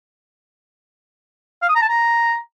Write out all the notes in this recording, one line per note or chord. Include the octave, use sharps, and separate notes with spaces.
F5
D#6
A#5
A5
A#5